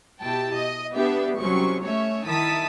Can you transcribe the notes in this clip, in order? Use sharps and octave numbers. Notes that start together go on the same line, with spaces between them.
B2 E4 G4 G5 A5
D#5
B3 D4 G4 E5
C2 F#3 C4 C#4 C#6
A3 C#4 C#5 E5
D#3 E4 A5 D#6 B6